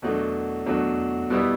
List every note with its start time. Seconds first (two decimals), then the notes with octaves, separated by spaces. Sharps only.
0.02 E2 B2 F#3 A3 D4
0.66 E2 B2 F#3 A3 D4
1.30 B2 G3 B3 E4